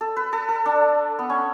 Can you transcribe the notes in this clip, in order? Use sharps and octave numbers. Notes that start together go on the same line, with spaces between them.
A4
B4
A4
A4
D4
B3
C#4